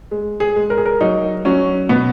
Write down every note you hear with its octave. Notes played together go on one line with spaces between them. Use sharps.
G#3
G#4
G#3
A#4
G#4
A#4
F#3 D#4
F#3 C#4
B2 B3